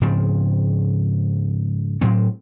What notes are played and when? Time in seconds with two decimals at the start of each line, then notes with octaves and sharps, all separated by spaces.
0.01 G#2 C#3 F3 C4
2.01 A2 F#3 C4